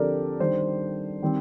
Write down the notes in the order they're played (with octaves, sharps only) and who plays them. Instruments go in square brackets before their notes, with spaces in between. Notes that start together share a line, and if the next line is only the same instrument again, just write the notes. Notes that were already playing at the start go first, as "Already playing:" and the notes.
Already playing: [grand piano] D3 F3 C4 G4 A4 A#4 D5
D#3 G3 D4 C5
D#3 G3 C4